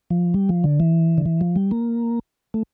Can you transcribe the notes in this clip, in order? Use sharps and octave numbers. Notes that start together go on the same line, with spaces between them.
F3
G3
F3
D3
E3
D3
E3
F3
G3
A#3
A3